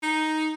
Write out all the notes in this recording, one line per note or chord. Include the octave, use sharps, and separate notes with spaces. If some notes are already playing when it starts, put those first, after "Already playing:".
D#4